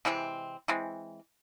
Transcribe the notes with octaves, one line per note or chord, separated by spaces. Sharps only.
C3 E3 G#3 C4
E3 G#3 C4